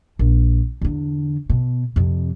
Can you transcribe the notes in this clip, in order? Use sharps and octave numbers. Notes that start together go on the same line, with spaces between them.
A#1
E2 D3
B2
F2 C3